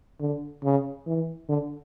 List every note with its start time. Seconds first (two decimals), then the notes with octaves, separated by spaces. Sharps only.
0.20 D3
0.64 C#3
1.07 E3
1.49 D3